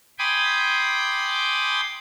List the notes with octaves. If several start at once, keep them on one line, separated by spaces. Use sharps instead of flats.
G5 G#5 B5 C6 D6 D#6